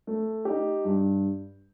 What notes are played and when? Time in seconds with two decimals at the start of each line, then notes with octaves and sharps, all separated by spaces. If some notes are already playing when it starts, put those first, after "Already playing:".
0.07 A3
0.45 D#4 G4
0.85 G2